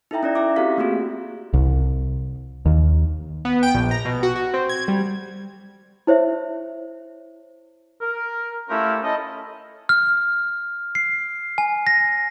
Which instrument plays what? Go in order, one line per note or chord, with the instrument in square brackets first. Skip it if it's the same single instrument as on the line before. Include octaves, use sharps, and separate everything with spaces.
[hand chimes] D#4 E4 A4 E5 G5 A#5
C#4 E4 D5
E4 E5 D6
C4 F#4 G4 A4 F5 B6
A3 A#3 C4 F4 F#4 G#4
[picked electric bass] C2
D#2
[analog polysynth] B3
G5
A#1
A#5
B2
F#4
F#4
C4
G#6
G3
[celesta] E4 C5 C#5 E5
[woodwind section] A#4
A3 C#4 E4 F4 G4 A#4
C#4 E4 A4 D#5
[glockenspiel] F6
C7
G#5
A#6